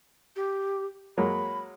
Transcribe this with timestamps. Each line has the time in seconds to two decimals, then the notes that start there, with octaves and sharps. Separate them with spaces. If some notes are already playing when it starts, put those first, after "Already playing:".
0.36 G4
1.18 F#3 G#3 A#3 B5